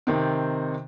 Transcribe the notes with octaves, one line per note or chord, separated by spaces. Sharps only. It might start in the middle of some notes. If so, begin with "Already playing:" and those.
C3 D#3 C4